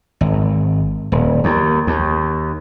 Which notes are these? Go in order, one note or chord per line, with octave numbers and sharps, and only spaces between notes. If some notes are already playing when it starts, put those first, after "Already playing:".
G#1
D#1
D#2
D#2